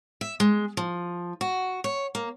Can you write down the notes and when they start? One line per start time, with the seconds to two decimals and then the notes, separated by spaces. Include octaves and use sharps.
0.21 E5
0.40 G#3
0.77 F3
1.41 F#4
1.84 C#5
2.15 A#3